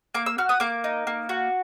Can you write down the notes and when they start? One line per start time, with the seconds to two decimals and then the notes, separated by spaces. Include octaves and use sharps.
0.14 A#3 D6
0.26 E6
0.38 F#4 F6
0.49 D#6
0.60 A#3 D6
0.84 D#4
1.07 A#3
1.29 F#4